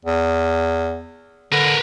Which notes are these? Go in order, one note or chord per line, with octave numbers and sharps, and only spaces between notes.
E2
D3 A#4 B4